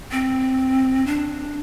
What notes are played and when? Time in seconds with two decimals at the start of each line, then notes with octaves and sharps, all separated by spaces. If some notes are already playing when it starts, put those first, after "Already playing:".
0.12 C4
1.07 D4